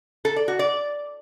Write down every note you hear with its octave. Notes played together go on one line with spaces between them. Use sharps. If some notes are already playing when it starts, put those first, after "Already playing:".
A4
D5
F#4
D5